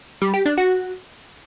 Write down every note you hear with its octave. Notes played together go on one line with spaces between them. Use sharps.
G3
G4
D4
F#4